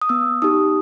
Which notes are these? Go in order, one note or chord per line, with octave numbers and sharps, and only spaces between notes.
D#6
B3 E6
D#4 G4 D#6